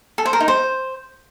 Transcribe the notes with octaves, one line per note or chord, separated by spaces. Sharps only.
A4
C5
A#4
D#4
C5